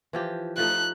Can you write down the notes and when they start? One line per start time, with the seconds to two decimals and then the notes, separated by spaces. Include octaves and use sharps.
0.13 E3 F3 G4
0.58 F3 A3 D#4 F#6